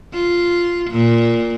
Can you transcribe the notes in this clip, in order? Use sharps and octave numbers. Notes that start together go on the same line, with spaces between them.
F4
A#2